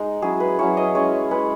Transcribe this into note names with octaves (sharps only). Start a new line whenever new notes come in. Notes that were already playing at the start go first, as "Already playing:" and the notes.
Already playing: G#3 D#4
F#3 C#4 E4 G#4
B4
F#3 C#4 E4 C#5
D#5
G#3 C#4 E4 C#5
G#3 C#4 E4 B4